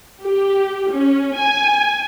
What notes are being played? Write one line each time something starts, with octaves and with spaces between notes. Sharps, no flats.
G4
C#4
G#5